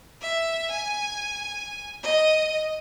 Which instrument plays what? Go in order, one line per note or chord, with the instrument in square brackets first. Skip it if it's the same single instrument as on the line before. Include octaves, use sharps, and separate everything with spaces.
[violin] E5
G#5
D#5